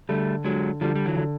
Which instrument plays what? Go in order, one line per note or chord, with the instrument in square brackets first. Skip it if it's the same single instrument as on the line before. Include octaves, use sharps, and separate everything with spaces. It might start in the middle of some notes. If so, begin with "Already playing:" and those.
[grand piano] D3 [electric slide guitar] G3 A3
[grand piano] D3 [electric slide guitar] F#3 G#3
[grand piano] D3 [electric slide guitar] F3 G3
[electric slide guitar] G3
E3 F#3
[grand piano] D3